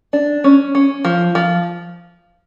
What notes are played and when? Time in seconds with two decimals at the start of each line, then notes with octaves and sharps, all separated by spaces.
0.13 D4
0.44 C#4
0.75 C#4
1.05 F3
1.35 F3